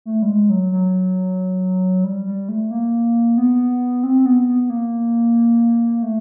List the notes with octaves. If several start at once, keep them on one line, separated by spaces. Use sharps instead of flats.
A3
G3
G#3
F#3
F#3
G3
G3
A3
A#3
B3
C4
B3
B3
A#3
A3